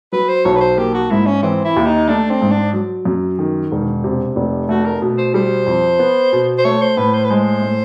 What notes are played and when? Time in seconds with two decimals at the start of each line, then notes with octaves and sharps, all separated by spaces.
0.12 F#3 B4
0.29 C5
0.45 B1 C#5
0.56 B4
0.61 C5
0.78 A#3 G4
0.94 F#4
1.11 G#2 E4
1.27 C#4
1.43 E3 C4
1.64 E4
1.76 D#2
1.86 D#4
2.08 A3 D4
2.31 C4
2.41 G#2
2.52 D4
2.73 F#3
3.05 F#2
3.39 D#3
3.71 E1
4.04 C3
4.36 F1
4.69 A3 F#4
4.85 A#4
5.02 B2
5.18 C5
5.34 G3 C5
5.66 F2
5.99 B3
6.32 B2
6.58 C5
6.65 A3 C#5
6.82 C5
6.97 A2 B4
7.14 C5
7.25 B4
7.30 G#3 C5
7.62 A2